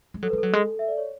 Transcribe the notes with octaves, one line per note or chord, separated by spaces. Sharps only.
G#3
F#3 A4
B4
G#3
F#3 A4
G#3
E5
D5
C#5